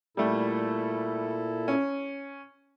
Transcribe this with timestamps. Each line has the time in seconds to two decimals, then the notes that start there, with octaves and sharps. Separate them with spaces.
0.17 A#2 G3 A3 E4 A4
1.68 C#4